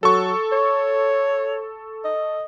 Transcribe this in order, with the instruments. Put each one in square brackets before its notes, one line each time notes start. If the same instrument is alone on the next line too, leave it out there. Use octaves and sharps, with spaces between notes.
[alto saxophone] F#3 [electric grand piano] A4 C#6
[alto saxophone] C#5
D#5